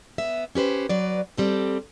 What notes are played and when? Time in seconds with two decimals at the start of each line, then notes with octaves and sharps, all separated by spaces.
0.18 B3 E5
0.55 C#4 G4 B4 C5
0.89 F#3 B4 D5
1.37 G3 C4 A4